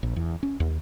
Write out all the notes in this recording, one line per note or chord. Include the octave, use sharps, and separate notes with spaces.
A#1
E2
C#4
D#2